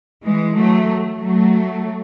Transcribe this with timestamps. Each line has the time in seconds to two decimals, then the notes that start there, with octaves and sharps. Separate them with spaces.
0.24 E3 G#3
0.57 F#3 A3
1.20 F#3 A3